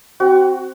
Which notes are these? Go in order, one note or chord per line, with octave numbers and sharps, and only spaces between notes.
C4 F#4